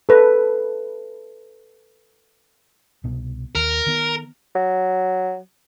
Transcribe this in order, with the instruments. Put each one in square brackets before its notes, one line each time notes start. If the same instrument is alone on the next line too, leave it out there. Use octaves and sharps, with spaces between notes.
[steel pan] A4 B4
[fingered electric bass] C2 B2
[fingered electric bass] D#2 [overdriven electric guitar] A#4
[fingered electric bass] D#3 B3
[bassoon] F#3